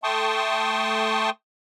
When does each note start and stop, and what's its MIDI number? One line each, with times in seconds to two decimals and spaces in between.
0.04 1.30 57
0.04 1.30 79
0.04 1.30 81
0.04 1.30 84
0.04 1.30 85
0.04 1.30 87